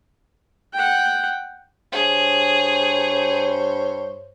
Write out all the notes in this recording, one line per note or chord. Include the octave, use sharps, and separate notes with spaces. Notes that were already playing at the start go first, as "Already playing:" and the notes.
F#5 G5
G2 G#4 C5 C#5